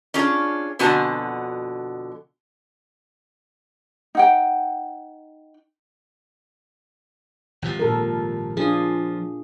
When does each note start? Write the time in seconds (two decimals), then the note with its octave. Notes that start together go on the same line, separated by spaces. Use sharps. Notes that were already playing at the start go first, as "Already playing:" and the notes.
0.14 C#4 D4 F4 G#4
0.79 F2 B2 D3 F#4 G#5 A5
4.15 D#4 F#5 G5
7.62 G#1 C3 F3
7.79 A#2 A4 A#4
8.57 F3 D4 F4 G#4